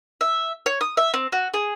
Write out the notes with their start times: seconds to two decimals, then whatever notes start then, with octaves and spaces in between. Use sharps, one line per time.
0.21 E5
0.66 C#5
0.81 D#6
0.97 E5
1.14 C4
1.32 F#4
1.54 G#4